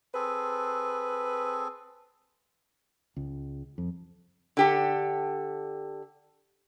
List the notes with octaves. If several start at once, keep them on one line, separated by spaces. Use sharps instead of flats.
C4 G#4 A4 B4
C#2
F2
D3 G4 A4